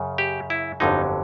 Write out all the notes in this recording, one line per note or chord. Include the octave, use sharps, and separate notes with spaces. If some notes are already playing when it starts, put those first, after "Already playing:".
Already playing: F#2 C#3
G4
E4
G1 F2 D3 F#3 D#4